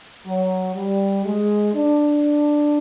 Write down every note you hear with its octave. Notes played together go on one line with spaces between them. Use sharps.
F#3
G3
G#3
D4